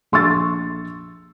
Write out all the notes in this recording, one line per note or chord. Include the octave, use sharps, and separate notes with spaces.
A#1 C6 C#6 E6 A6